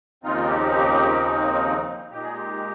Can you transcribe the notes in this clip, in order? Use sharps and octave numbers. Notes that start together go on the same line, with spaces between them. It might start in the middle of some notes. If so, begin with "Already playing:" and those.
D#2 C#3 F3 C4 D#4 F4
G4
G4
G4
A#2 G#3 D#4 G4
G#4
G4